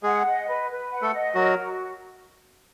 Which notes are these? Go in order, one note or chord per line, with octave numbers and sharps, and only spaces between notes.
G#3 G#4 F#5
D#5
B4
B4
F#5
A3 A4
D#5
F#3 F#4 A#4
F#4